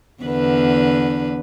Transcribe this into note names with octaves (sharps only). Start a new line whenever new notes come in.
E2 D3 B4